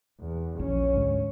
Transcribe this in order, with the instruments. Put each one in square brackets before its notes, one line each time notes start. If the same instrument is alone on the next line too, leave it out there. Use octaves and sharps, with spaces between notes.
[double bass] E2
[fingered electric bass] A#1 [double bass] C#4
[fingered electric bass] D2 G#2 G#3